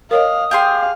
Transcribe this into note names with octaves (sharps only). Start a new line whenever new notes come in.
A#4 C#5 D#5 F5 D#6
G4 G#4 F5 C6